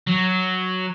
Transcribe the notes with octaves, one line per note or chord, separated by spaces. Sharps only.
F#3